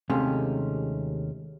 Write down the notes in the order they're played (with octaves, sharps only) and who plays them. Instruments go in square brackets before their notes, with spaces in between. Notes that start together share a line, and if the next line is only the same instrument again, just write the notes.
[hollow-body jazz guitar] D#2 C3 G#3 A3 C#4